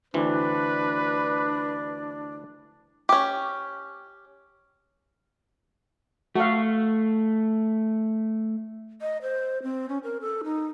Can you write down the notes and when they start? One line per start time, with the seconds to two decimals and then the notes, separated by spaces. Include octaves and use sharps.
0.14 D2 E3 C4 D4 B4
3.09 C#4 G4
6.35 A3 F#4 A4 F5
9.01 D#5
9.22 C5
9.63 C4
9.89 C#4
10.03 A#4
10.21 A4
10.44 D#4